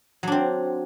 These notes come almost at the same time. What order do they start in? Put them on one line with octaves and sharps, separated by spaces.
F#3 D4 C4